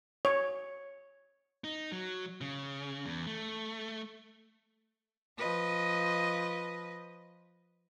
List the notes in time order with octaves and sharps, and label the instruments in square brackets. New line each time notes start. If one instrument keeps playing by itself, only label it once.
[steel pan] C#5
[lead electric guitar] D#4
F#3
C#3
E2
A3
[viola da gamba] F3 B4 D#5